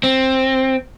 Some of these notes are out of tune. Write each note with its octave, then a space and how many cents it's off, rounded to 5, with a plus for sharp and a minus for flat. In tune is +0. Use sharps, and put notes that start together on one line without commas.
C4 +10